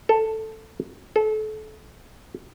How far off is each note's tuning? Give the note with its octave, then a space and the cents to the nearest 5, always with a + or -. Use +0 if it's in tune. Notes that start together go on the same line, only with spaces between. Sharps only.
A4 +5
A4 -30